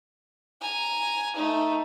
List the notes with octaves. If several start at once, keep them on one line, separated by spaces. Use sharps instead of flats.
G#5 A#5
A3 D#4